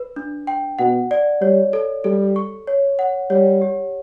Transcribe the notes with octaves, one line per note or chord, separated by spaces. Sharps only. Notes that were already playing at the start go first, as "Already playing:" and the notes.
Already playing: B4
D4
G5
B2 F#5
D5
G3 C#5
A4
G3 A4
C#6
C#5
F#5
G3 C#5
G4